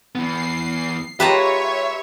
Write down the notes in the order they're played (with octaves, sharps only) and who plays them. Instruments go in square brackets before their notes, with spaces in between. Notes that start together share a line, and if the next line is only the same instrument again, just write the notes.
[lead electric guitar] E3 B3 [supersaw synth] C7
[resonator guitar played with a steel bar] G#3 F4 G4 [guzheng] B4 A5 A#5 [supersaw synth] C#5 [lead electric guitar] E5